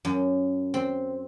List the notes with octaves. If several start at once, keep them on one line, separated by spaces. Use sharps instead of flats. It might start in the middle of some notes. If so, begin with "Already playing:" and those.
F#2
C4